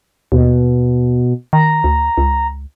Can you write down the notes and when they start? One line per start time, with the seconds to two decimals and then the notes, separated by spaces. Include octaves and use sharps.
0.32 D#2 B2
1.53 D#3 A#5
1.84 D2
2.18 C#2